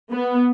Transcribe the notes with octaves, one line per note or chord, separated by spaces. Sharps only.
B3